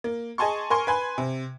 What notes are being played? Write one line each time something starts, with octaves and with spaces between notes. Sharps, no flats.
A#3
G#4 D#5 G#5 A5 C6 C#6
A#4 G#5 C6 C#6
B4 G#5 B5 C6
C3